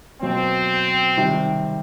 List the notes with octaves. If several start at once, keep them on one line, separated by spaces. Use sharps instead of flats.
B2 F#3 A#3 C4
C3 D#3 G3